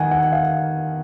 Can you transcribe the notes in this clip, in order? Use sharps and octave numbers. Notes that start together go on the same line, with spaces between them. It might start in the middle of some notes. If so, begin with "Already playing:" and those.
Already playing: D#3 F#5 G#5
F#5
F5